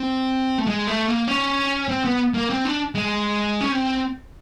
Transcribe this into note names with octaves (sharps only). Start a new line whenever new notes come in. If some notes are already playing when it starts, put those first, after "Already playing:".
Already playing: C4
A3
G#3
A3
A#3
C#4
C4
B3
A#3
C4
D4
G#3
C#4
C4